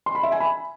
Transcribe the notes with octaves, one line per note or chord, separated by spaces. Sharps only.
C6
B5
E5
G#5
B5